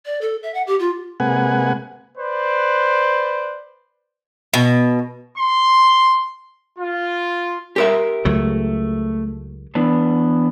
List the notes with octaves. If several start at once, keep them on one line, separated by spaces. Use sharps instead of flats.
D5
A4
E5
F#5
G4
F4
C3 G#3 A#3 B4 F#5 G#5
B4 C5 D5
B2
C6
F4
G4 A#4 E5
C#2 F#3 A3
E3 B3 D4